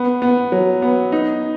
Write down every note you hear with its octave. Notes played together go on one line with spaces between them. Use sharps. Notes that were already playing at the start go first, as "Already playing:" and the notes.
Already playing: B3
B3
F#3
B3
D#4